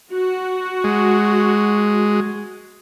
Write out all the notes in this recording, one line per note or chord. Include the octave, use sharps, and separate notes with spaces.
F#4
G#3